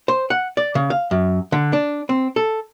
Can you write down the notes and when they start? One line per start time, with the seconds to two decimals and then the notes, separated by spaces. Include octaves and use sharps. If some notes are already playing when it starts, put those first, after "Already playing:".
0.08 C5
0.30 F#5
0.57 D5
0.75 C#3
0.90 F5
1.11 F#2
1.52 D3
1.73 D4
2.09 C4
2.36 A4